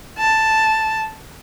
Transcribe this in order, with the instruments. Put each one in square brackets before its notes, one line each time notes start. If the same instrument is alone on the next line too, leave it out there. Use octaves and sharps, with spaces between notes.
[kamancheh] A5